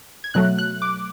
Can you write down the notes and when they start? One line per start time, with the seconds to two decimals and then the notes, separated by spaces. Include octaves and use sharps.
0.24 G#6
0.34 B2 F#3 A3 F#6
0.58 F#6
0.82 D6